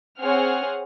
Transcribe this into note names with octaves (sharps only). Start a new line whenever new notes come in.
C4 G#4 C#5 F#5 F6